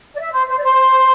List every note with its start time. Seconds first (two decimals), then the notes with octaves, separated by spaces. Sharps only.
0.14 D5
0.19 E5
0.33 C5
0.47 C5
0.58 D5
0.62 C5